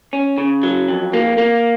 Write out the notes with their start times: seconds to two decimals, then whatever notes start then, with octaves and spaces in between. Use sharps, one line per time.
0.13 C#4
0.38 C#3
0.63 F#3
0.88 F2
1.13 A#3
1.38 A#3